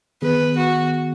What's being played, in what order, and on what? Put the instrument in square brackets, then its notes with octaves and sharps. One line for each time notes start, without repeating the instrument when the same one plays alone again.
[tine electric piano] D#3 B3 G#4 [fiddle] B4
[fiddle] F#4